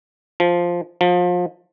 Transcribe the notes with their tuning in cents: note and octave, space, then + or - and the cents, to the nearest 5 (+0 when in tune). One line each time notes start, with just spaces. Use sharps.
F3 +0
F3 +30